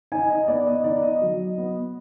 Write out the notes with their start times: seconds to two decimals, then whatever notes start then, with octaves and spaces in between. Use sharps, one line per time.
0.12 D#4 G#5
0.30 D#5
0.48 B3 D5
0.67 D#5
0.84 D#4 D5
1.03 D#5
1.21 F#3
1.58 B3